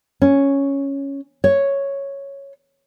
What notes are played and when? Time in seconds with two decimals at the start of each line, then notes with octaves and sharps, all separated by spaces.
0.22 C#4
1.44 C#5